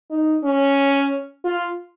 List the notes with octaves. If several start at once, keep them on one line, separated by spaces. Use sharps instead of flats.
D#4
C#4
F4